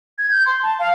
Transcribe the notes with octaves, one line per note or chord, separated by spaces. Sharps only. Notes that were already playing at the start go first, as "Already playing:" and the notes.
G#6
G6
C6
A5
F5